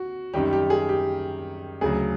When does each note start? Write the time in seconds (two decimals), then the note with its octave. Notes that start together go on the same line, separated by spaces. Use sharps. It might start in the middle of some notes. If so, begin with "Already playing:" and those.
Already playing: F#4
0.34 F#2 D#3 G3 G4
0.53 G4
0.70 G#4
0.89 G4
1.81 D2 C#3 F#3 G#4